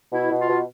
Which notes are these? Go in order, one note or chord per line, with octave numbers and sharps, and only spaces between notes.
B2 E4
B2
F4
B2